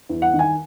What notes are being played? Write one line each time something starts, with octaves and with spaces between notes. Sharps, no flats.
E2
F#5
D#3
G#5